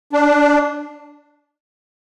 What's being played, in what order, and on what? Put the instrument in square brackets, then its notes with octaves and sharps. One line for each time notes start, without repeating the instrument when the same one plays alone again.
[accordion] D4